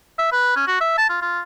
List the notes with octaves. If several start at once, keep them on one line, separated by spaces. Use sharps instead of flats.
E5
B4
C#4
F#4
E5
A5
F4
F4